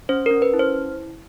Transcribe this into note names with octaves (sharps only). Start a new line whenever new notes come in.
C#4 C5
C#4 A#4
B4
E4
C5